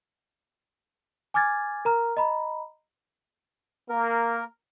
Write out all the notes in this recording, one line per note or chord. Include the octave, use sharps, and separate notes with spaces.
G#5 D6 F6 G#6 A6
A#4 A#5 F6
D#5 A#5 B5
A#3 A#4